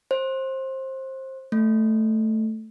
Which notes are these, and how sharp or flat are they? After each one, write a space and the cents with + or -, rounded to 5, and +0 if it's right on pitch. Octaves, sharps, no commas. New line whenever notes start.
C5 +20
A3 +0